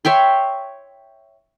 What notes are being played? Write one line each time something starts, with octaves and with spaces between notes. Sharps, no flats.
C#5 E5 G5 C6